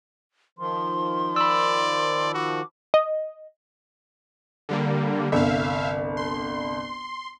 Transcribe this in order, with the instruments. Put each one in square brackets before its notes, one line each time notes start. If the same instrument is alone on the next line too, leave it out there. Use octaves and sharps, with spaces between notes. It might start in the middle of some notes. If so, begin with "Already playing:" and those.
[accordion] D#3 F3 [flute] C6
[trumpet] D5 [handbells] B5 E6
[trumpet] F#4 [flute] D6
[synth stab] D#5
[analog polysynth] D3 G3 A#3
[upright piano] G1 C2 [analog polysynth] E5 F5
[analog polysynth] C6